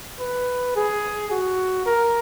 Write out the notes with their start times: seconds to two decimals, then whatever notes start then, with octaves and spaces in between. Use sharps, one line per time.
0.20 B4
0.76 G#4
1.31 F#4
1.86 A#4